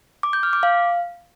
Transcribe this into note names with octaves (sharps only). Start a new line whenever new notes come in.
D6
G6
F6
D6
F5